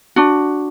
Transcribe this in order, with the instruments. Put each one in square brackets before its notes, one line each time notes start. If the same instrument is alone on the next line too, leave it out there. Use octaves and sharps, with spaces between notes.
[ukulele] D4 F#4